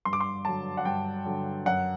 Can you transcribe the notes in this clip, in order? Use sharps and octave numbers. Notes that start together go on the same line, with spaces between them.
G2 C6
D6
C6
D3 F#3 A5
F#5
G2 G5
D3 F#3
F#2 F#5